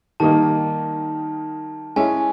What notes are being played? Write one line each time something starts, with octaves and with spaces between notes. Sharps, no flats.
D#3 G3 A#3 D#4 A5
G#3 C#4 E4 G#5